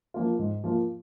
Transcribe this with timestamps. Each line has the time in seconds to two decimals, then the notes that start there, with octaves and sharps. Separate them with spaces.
0.14 F3 A#3 F4
0.39 G#2
0.64 F3 A#3 F4